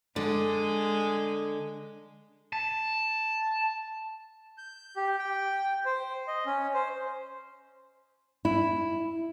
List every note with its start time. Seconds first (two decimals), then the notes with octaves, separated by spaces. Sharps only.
0.16 D3 G#3
2.53 A5
4.58 G6
4.96 G4
5.19 G5
5.85 C5
6.28 D#5
6.46 C#4
6.74 C5
8.45 E4